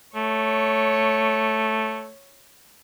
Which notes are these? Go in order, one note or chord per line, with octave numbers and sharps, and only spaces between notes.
A3 C#5